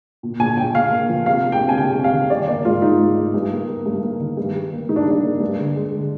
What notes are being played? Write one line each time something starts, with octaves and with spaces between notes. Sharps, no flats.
A#2
A#2 G#5
A#2 G5
A#2 F5
A#3
F3
C3 F5
A#3
G5
C3
G#5
C3 G5
C3
F5
D#3
G3 D5
A#3 D5
G#2 F4
G#2 D#4
G#2
G#2
G2
A#3
A#3
G2
A#3
D#3
G2
G3
A#3
G2 D#4
D4
G3 D4
A#3
G2
D3
G#3
D3